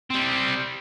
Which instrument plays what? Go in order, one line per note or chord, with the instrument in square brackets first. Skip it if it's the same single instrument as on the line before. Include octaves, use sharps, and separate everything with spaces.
[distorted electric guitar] G3 C4